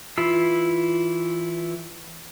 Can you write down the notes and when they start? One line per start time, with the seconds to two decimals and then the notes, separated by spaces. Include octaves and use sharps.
0.18 E3 E4 F4 E6